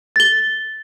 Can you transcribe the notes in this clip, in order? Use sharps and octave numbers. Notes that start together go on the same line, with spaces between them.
A6 G7